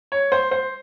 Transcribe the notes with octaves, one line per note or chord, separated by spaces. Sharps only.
C#5
C5
C5